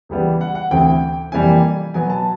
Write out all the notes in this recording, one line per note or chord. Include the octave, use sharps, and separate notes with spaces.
C#2 C#3 E3 G3 B3
F#5
F#5
D2 C3 E3 G5
F2 C3 E3 G3 A#3 G#5
B2 F#3 B3 G#5
A5